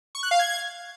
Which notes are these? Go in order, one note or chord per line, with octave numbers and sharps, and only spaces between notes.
C#6
F#6
F5
G#6